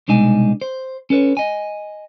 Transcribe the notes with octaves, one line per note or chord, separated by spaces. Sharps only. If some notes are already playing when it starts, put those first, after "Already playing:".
C2 B2 G#3 D4 D#4 G#5
C5
C#4 A4 B4 C#5
D#5 G#5